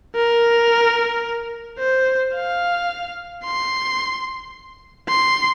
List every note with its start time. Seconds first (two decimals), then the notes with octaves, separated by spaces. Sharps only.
0.15 A#4
1.79 C5
2.35 F5
3.44 C6
5.08 C6